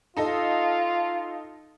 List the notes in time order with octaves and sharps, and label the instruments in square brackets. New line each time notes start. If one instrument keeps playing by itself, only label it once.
[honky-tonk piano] D#4 A4 D#5 [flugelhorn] F4